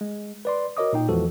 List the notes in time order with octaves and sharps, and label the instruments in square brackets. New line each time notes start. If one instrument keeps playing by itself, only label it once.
[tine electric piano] G#3
B4 D5 C6
F#4 A#4 C#5 D#5 D6 D#6
A#2 D#4 G5
E2 E3 F3 G#3 F#4 A4